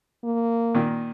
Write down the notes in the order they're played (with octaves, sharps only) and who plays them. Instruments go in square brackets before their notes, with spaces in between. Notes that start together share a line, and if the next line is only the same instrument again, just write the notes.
[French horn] A#3
[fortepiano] A#2 D#3